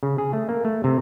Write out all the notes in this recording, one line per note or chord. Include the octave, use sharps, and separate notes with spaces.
C#3
G#4
A3
A#3
A3
C3